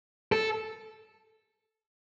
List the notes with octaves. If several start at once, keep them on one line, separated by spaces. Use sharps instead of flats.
A4